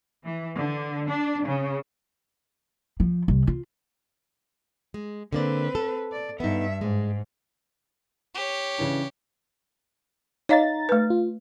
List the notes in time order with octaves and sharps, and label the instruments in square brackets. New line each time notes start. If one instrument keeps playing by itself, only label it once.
[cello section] E3
D3
D4
C#3
[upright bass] F3
C2
F4
[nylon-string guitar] G#3
[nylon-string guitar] D3 A#3 D5 [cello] C4 B4
[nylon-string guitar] A4
[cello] D5
[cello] G2 E5 [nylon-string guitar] B3 D#4
[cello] G#2 [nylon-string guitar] G#3
[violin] G4 C#5
[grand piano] C#3 E3 D4
[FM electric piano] D#4 A#5 A6 [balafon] C#5 D#5 F5
[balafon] A3 B4
[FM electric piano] F4